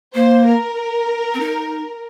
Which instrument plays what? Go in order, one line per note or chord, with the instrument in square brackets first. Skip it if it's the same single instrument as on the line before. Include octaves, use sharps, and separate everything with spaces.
[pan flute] A#3 [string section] C5
[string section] A#4
[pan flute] C4
D#4